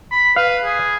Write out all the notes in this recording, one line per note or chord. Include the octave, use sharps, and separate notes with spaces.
B5
B4 F5
G#4